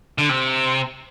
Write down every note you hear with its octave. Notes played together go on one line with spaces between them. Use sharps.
D3
C3